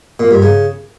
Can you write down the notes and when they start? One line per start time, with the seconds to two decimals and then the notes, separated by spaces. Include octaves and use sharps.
0.20 A#2
0.31 G2
0.42 C#3